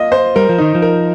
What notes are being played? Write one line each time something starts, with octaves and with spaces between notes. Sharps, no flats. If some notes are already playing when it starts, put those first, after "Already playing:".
Already playing: A#3 F4 D#5
C5
G3 A#4
F3
D#3 D#4
F3
A#4